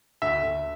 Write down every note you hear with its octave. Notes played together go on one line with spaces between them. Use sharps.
D2 E5
D2